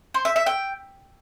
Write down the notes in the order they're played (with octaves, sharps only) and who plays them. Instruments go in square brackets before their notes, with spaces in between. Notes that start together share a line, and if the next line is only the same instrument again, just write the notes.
[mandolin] C5
E5
E5
G5